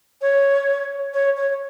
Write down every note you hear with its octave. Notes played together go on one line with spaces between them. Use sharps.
C#5
C#5
C#5